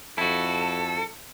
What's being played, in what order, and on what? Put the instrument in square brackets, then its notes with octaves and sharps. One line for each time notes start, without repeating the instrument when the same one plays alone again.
[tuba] F2 [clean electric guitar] E4 F#4 [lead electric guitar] A4